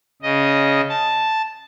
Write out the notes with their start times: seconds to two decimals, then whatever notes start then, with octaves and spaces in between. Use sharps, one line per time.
0.22 C#3 D#5
0.89 A5